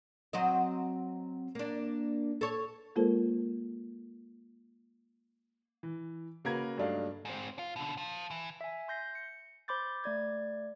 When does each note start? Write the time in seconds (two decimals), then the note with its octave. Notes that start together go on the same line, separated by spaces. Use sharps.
0.33 F#3 C4 D#5
1.55 A#3 D4
2.41 A4 C#5
2.96 G#3 A#3 F4 A4 A#4 C5
5.83 E3
6.45 C#3 A#3 F#4 A#4 B4 G#6
6.78 G2 F#3 A3 D4 D#4 F5
7.25 G#2 C4
7.59 F4
7.76 B2 D3
7.97 F5 A5
8.31 E3
8.61 E5 G#5
8.88 C6 G6 A#6 C7
9.15 C#7
9.68 C5 B5 C6 D6 G6 A6
10.04 A3 D5 G#6